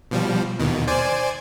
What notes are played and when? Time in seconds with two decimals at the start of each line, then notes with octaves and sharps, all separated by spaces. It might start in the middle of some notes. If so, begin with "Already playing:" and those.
0.11 B2 F3 G3
0.60 D#2 B2 D#3
0.87 C5 D5 G#5